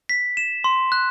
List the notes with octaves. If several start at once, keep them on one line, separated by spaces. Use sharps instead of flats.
B6
E7
C6
F#6